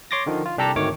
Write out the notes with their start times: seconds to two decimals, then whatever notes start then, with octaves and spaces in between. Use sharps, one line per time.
0.11 C#5 C6 D6 A6 A#6
0.26 D3 D#3 F3
0.46 F4
0.58 C2 D4 G4 A4 A#5 E6
0.76 G#1 D2 D#3 A3 C#5 D6